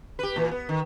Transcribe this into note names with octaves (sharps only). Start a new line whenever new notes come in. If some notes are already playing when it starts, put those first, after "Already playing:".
G4 B4
A#2 E3
B3
D#3